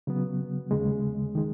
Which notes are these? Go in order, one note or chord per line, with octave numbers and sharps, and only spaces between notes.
C#3 F#3 B3
D#2 C#3 G#3
D#3 G#3